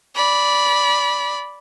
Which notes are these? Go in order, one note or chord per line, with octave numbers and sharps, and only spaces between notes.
D5 B5